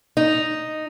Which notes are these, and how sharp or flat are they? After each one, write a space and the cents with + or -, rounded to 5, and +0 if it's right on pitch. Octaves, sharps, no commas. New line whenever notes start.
D#4 -5